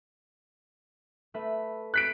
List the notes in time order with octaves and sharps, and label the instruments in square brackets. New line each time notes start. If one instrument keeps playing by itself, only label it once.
[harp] A3 B4 E5
[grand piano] F#6 B6 D7